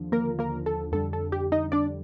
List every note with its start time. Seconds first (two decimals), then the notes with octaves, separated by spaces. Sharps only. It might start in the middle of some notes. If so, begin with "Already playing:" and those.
Already playing: D#2 D3 F3
0.12 A#3 A#4
0.39 A#3 A#4
0.66 A4
0.92 F2 D3 G3 A4
1.13 A4
1.32 G4
1.52 D#4 D#5
1.72 D4 D5